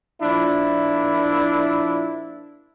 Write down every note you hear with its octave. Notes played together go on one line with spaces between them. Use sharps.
A#2 F3 D4 E4